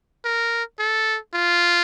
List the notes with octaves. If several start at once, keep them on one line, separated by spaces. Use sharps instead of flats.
A#4
A4
F4